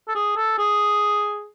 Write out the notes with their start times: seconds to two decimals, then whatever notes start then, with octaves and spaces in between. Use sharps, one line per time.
0.08 A4
0.15 G#4
0.37 A4
0.58 G#4